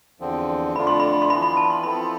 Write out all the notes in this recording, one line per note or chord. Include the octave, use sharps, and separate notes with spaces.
E2 D3 F3 C4
F2 D3 A3 D4 F4 B5
C6
B5
C6
E3 B3 F4 B5
B5
A5
C6
F3 C4 E4 A4 B5